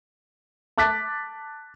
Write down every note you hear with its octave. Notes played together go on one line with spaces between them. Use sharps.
A5 D6 F#6 A6 B6